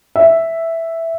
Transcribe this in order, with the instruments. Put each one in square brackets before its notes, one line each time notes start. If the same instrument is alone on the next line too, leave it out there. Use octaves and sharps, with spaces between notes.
[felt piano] E5